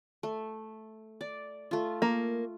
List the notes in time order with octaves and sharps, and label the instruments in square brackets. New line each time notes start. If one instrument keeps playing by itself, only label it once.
[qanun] A3
D5
A3 F4
[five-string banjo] A#3